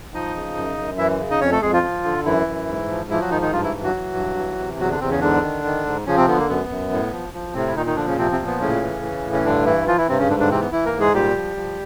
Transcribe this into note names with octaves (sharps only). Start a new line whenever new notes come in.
F3 D#4 D#5
C#3
F#2
F#2
E3 E4 E5
C#3
D#4 D#5
F2 C#4 C#5
A3 A4
F2 G#3 G#4
F3 F4
F3
D3
F#2 E3 E4
F#2
G#2
F3
E3 F3 E4
F#3 F#4
G#2 D#3 D#4
D#3 D#4
G2 F3 F4
E3 E4
E3
F#3 F#4
E3
G2
E3
C3
E2 F#3 F#4
D3 D4
E2 C3 C4
C#3 C#4
G#2 D3 D4
D#3
D#3
G#2
C#3 F3 C#4
C3 C4
D3 B3
A#3
F#2 B3
F#2
A2
F3
F3
A2 C3 C4
E4
A#2 D#3 D#4
D#3 D#4
D3 F3 D4
C#3 C#4
C3 F3 C4
C3 C4
A#2
B3
A2 C#3 C#4
E3
E3
A2
C#4
G2 D3 D4
E3 E4
E3 F3 F4
E3 E4
G2 C3 C4
C#3 C#4
G#2 D3 D4
D3 D4
C3 E3 C4
B3
E3 E4
A#3 A#4
G#2
G#3 G#4
A#2 G3 G4
F3
F3